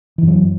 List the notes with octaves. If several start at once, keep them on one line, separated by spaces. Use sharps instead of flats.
F#2 E3 F#3